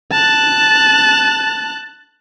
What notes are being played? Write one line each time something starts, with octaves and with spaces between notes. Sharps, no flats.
A5 F#6